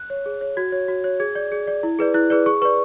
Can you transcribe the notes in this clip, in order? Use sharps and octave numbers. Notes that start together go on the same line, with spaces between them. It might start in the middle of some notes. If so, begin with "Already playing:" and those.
Already playing: F#6
C#5
G#4
C#5
F#4 G#6
C#5
F#4
C#5
G#4 G#6
D5
G#4
D5
E4
G#4 B4 D5
E4 F#6
G#4 B4 D5
G#4 C#6
B4 D5 C#6